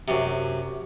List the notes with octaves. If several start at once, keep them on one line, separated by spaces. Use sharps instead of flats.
F#2 C3